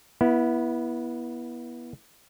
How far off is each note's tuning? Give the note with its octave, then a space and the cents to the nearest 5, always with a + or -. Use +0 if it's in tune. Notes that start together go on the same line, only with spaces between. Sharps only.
B3 -25 E4 +0